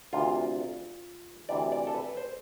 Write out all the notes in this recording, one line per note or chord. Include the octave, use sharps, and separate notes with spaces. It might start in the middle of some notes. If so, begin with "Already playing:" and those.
D2 C3 E3 F4
D2 C3 E3 D5
D5
A4
B4
C5